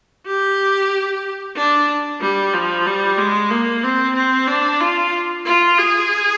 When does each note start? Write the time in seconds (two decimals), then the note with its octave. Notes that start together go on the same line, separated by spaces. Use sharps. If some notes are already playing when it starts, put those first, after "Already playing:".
0.26 G4
1.56 D4
2.21 G3
2.54 F3
2.86 G3
3.18 G#3
3.50 A#3
3.83 C4
4.16 C4
4.47 D4
4.81 F4
5.46 F4
5.78 G#4